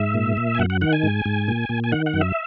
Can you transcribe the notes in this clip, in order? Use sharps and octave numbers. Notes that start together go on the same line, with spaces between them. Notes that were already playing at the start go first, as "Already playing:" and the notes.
Already playing: G#2 E5
A#2
A#2
G#5
F#2 F#5
F#5
D#3 F#5
G#5
G#2
G#2
A#2
A#2
G#5
D#3 F#5
F#5
F#2
E5